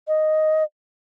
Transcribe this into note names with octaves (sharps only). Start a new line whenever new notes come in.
D#5